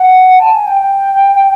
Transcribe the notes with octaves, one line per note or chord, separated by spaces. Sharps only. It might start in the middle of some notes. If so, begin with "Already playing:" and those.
Already playing: F#5
A5
G#5
G5